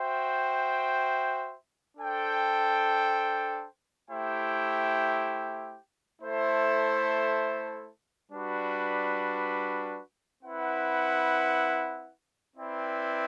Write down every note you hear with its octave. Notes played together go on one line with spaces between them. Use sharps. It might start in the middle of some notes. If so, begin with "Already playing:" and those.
Already playing: F#4 C5 E5 G5
D4 A4 C5 G5
A3 E4 G4 C5 G5
A3 E4 A4 C5 E5
G3 D4 F#4 B4
C4 E4 B4 F#5
C4 E4 B4 D5 G5